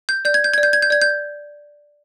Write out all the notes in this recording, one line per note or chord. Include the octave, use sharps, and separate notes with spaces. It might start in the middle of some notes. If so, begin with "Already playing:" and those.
G6
D5 G6
G#6
G6
D5 G#6
G6
G#6
G6
D5 G#6
G6